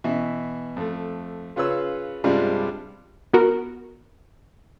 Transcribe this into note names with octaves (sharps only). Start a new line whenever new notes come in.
B2 E3 E5
F2 A3
C#3 F4 B4 C#5 E6
G2 C3 G3 G#3 D4 F4
B3 F#4 A#4